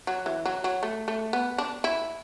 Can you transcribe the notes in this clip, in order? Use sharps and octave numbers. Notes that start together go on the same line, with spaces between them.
F#3
E3
F#3
F#3
A3
A3
B3
D4
E4